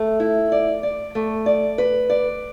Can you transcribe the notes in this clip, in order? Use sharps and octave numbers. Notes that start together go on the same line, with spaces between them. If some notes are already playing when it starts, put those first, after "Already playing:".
Already playing: A3
E4
D5
D5
A3
D5
B4
D5